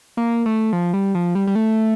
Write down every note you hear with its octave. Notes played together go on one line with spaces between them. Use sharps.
A#3
A3
F3
G3
F3
G3
G3
A3